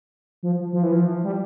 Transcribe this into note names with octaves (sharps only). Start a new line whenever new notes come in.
F3
F3
E3
F3
G3